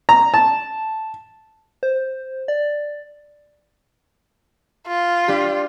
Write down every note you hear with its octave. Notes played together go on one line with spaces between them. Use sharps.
A#5
A5
C5
D5
F4
D4 G4